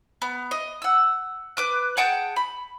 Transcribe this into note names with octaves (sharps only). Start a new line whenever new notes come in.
B3
D#5
F#5 E6
B4 D6 F#6
G#4 F#5 G5 A5
B5